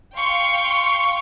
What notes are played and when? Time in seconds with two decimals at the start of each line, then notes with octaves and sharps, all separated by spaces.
0.15 F5 G5 C6 C#6